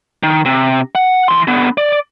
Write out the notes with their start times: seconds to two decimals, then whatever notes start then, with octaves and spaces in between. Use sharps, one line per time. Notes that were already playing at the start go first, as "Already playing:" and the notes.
0.23 D#3
0.45 C3
0.95 F#5
1.28 E3 C6
1.48 D3 B3
1.78 D5